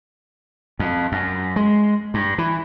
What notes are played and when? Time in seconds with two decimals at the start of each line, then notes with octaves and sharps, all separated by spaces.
0.79 F2
1.12 F#2
1.56 G#3
2.14 G2
2.38 E3